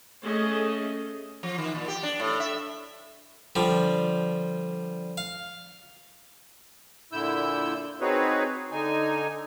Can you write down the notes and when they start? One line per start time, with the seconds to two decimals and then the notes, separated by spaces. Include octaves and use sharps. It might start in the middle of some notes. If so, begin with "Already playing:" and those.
0.23 A3 C#4 G#4 D#5
1.43 F3
1.58 D#3
1.75 A#2
1.88 G4
2.03 D4
2.20 A2
2.40 E5
3.56 D3 F3 G3
5.17 F5
7.12 A#2 D3 E4 E6 G6
8.01 C4 D#4 F#4 G#4 B4 C#5
8.72 D3 D#4 G#5